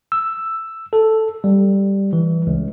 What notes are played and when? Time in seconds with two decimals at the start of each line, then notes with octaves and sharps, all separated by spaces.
0.12 E6
0.93 A4
1.44 G3
2.13 E3
2.47 C#2